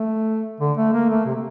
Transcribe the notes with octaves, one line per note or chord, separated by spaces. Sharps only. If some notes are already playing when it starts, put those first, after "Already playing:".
Already playing: A3
D3
A3
A#3
A3
C3